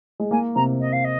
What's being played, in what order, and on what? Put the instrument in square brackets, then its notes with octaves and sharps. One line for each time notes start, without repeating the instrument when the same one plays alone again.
[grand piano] G#3
[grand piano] A#3 [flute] G#5
[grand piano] C3 [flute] A#5
[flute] D#5
F5
D#5